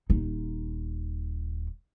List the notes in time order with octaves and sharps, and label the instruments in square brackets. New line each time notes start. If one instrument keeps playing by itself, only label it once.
[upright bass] D#1 D#4